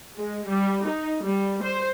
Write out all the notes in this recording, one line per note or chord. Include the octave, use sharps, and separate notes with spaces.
G#3
G3
D#4
G3
C5